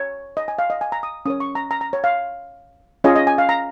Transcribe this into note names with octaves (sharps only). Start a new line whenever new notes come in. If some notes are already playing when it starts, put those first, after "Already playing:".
Already playing: C#5
D#5
G#5
F5
D#5
G#5
A#5
D#6
C#4 A#4 C#5 D#6
C#6
A#5
A#5
A#5
C#5
F5
C#4 F4 G#4 C#5 D#5
D#5
G#5
F5
A#5